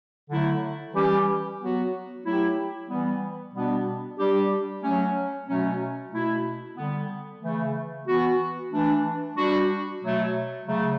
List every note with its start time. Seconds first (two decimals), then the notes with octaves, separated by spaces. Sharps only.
0.30 D3 F#3 A3 E4
0.94 E3 G3 C#4 G4
1.59 F#3 B3 F#4
2.23 F#3 A3 E4 G4
2.89 E3 G3 B3
3.53 B2 G3 B3 D4
4.19 G3 D4 G4
4.83 F#3 A3 C#4
5.47 B2 F#3 A3 C#4
6.12 B2 A3 E4
6.77 D3 G3 B3
7.41 C#3 E3 A3
8.07 E3 B3 F#4
8.72 E3 A3 D4
9.36 G3 D4 F#4
10.02 B2 F#3 A3
10.66 C#3 F#3 A3